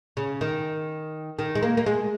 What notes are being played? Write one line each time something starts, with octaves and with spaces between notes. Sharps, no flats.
C#3
D#3
D#3
G#3
A#3
A#3
G#3